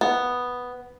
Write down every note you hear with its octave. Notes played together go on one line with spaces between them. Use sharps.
B3